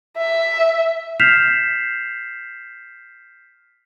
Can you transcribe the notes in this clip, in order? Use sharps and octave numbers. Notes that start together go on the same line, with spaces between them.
E5
F6 G6 B6 C7 E7 F7